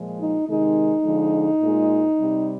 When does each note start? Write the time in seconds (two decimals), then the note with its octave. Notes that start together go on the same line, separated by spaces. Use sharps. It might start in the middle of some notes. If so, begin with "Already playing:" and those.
Already playing: A#2 F3 G#3
0.19 D#4
0.47 C3 D#3 G#3 D#4
1.04 D3 F3 G#3
1.61 A#2 G#3
2.17 C3 G3